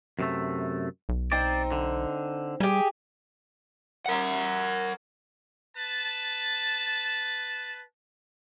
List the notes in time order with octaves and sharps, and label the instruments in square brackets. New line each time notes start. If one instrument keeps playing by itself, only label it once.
[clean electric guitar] F#2 C3 A3
[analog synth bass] B1
[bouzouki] C4 D#4 C5 [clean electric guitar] D5
[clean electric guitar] D3
[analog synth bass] G3 [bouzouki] G4 G#4
[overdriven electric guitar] A#4 F#5
[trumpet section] B4 A5